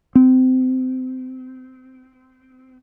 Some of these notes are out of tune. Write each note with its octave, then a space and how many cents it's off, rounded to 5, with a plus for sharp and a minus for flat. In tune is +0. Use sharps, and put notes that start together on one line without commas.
C4 -25